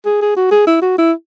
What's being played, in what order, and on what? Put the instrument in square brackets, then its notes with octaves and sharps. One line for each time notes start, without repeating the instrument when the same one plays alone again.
[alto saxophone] G#4
G#4
F#4
G#4
E4
F#4
E4